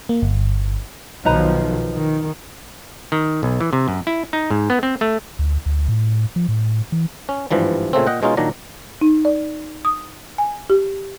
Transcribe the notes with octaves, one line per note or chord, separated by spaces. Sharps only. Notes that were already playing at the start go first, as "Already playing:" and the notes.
A#3
G1
B1 D#3 F3 D#4 B4 A#5
D#3
D#3
B1
E3
C3
F#2
E4
D#4
G#2
B3
C4
A3
D2
D2
A2
F3
A2
E3
C#4
G#1 G2 E3 F3 G3
A#2 C#3 A3 C4
A#2 D#5 F#5 G5
B2 G#3 C#4 D#4 F4
A#2 D#3 F#3 D4 A#5
D#4
D5
D#6
G#5
G4